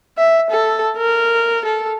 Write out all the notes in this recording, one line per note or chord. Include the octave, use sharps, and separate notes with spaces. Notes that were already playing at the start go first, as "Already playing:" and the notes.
E5
A4
A#4
A4